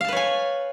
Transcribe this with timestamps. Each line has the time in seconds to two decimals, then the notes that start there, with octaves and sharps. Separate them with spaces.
0.01 F5
0.05 A5
0.09 B4
0.12 C#5
0.16 G#5